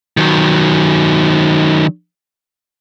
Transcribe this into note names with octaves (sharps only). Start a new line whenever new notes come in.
D#3 F#3